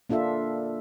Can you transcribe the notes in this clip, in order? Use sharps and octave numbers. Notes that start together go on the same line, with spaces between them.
A#3 D4 F4 A4 E5